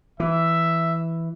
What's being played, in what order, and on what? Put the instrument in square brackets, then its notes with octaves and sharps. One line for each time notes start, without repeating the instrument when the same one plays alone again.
[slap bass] E3 [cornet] E5